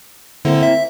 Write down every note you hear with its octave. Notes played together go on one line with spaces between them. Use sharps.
D3 A#3 C4 E4
E5